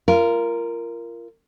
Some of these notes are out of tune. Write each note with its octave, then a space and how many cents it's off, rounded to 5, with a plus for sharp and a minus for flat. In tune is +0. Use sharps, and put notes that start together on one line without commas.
F4 -30 A#4 +0